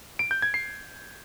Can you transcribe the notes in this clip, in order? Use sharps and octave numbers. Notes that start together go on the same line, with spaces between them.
D7
G6
G#6
C7